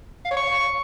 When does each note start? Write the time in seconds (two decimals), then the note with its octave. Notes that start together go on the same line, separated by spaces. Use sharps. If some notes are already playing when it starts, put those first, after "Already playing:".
0.25 F5
0.31 C#5
0.37 C#6